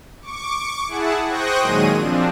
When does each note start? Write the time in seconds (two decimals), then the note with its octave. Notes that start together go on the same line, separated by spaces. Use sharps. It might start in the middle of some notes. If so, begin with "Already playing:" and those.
0.22 C#6 D6
0.88 E4 G#4 F#5 A5
1.26 C5 G5 C#6 D#6 F#6 A#6
1.60 A#2 D#3 F#3 G#3 G#4 D#7
1.95 F3 C4 D4